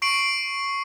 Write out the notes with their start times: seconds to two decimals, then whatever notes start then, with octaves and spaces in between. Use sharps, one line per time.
0.02 C#6 C7 D7 F#7